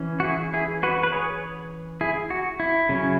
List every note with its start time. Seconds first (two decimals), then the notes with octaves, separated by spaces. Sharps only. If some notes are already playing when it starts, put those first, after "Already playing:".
Already playing: E3 C#4
0.20 F#4
0.24 E4 G#4
0.54 E4 G#4
0.83 F#4 B4
1.03 B4
1.12 G#4 C#5
2.01 E4 G#4
2.30 F#4
2.60 E4
2.89 C#3 F#3 C#4